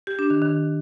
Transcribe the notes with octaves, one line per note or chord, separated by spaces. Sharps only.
G4
D4
D#3
D#3